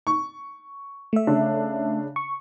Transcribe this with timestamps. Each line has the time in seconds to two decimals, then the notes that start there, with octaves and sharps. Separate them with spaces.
0.07 C#6
1.13 A3 E5
1.27 C#3 D4
2.16 C#6